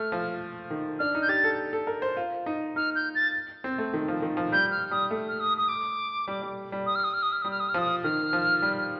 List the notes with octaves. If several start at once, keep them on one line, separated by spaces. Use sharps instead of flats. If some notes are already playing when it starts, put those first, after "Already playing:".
Already playing: A3 F6
F3
D#3
D4 F6
D#4
G6
G4 A6
A4
A4
A#4
C5
F4
D#4
D#4 F6
G6
A6
C4
A3
D#3
F3
D#3
F3
G3 G6
F6
G3 D#6
A3
F6
D#6
D#6
D6
G3
G3
G3
D#6
F6
D#6
F6
D#6
F6
G3 D#6
F6
D#6
F6
F3 D#6
D#3 F6
F3
G3